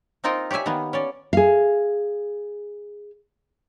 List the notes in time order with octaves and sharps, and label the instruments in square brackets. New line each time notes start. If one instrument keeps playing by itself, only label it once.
[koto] A#3 C4 D#4 F4 A#4 D#5
G4 C#5 D5 E5 G#5
D#3 A#3 B3
C#4 C#5 D5
[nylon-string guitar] G#4 F5